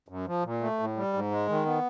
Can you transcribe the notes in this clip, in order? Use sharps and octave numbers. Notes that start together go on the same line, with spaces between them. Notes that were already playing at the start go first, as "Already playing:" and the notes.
F#2
F3
A#2
A3
A2
G3
G#2
G#3
D#3
B3